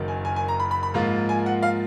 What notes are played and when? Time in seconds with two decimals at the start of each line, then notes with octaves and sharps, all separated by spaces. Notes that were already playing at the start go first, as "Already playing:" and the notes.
Already playing: F#1 F#2 D#3
0.08 G#5
0.25 G#5
0.36 G#5
0.48 A#5
0.60 B5
0.71 B5
0.83 B5
0.94 G#2 F3 A#3 F4 A#5
1.29 G#5
1.46 F#5
1.62 F5